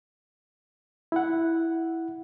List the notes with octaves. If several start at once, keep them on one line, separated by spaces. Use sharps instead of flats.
E4 F#5